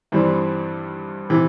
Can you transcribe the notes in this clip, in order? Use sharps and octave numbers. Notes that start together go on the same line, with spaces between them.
G2 E3 G3 C4
C3 E3